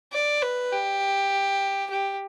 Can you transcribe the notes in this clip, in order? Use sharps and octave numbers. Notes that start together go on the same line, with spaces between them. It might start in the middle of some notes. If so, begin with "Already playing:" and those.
D5
B4
G4
G4